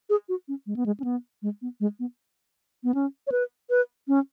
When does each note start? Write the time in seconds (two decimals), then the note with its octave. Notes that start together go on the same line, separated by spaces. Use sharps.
0.10 G#4
0.29 F#4
0.48 C#4
0.67 G#3
0.76 B3
0.86 G#3
1.00 C#4
1.04 B3
1.42 G#3
1.62 B3
1.80 G#3
1.99 B3
2.84 B3
2.94 C#4
3.27 C#5
3.32 B4
3.70 B4
4.08 C#4